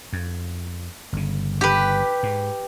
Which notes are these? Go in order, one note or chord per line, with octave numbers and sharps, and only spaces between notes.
F2
G1 C#3
G4 B4
G#2